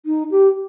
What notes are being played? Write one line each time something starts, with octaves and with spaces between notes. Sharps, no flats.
D#4
G4